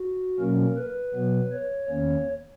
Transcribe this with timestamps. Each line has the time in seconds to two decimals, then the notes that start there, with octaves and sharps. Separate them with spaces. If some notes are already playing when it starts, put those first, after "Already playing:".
Already playing: F#4
0.39 B2 F#3 A#3 C#4 A#4
0.77 B4
1.14 B2 F#3 B3
1.52 C#5
1.89 E2 D#3 A#3 C#4 C#5